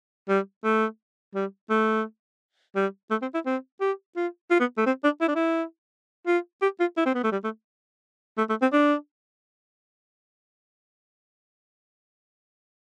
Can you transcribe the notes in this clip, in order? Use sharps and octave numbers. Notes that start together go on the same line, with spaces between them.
G3
A3
G3
A3
G3
A3
C4
E4
C4
G4
F4
F4
B3
A3
C4
D4
E4
D4
E4
F4
G4
F4
E4
C4
B3
A3
G3
A3
A3
A3
C4
D4